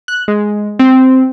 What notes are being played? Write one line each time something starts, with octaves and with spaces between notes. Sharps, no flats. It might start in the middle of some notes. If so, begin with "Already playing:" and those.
F#6
G#3
C4